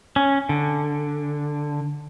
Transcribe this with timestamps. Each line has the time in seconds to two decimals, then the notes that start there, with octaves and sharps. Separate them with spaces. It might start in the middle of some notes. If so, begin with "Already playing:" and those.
0.16 C#4
0.49 D3